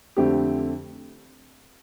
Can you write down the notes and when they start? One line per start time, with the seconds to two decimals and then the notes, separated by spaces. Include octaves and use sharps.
0.17 F2 D3 A3 C4 G4